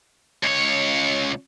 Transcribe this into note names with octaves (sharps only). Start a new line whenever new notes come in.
C#2 C#5